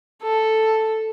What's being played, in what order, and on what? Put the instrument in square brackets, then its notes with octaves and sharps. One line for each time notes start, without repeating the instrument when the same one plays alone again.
[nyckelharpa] A4